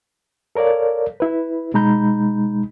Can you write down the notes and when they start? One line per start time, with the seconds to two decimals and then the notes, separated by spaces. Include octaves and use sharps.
0.55 A4 A#4 C#5 D5 F5
1.20 E4 B4
1.74 B2 G#3 D#4 A#5 B5 G6